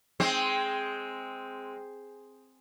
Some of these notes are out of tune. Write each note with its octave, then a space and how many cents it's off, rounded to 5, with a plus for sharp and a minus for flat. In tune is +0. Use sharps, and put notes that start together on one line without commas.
G#3 +0 C4 +0